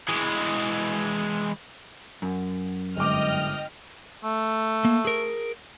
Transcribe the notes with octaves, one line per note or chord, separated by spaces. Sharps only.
E3 G#3
F#2
G1 G#2 D#5 G5 D6 F6
A3
A#3
G#4 A#4